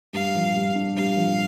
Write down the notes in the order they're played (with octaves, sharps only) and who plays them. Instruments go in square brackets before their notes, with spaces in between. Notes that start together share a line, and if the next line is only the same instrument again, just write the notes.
[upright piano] G2 [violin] F5
[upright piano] F3
G2
D4
[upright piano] G2 [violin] F5
[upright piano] F3